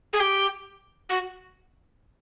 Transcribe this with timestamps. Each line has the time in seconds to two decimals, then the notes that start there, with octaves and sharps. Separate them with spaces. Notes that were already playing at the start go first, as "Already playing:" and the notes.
0.12 G#4
0.19 G4
1.09 F#4